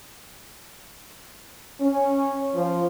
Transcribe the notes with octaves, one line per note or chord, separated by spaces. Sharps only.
C#4
F3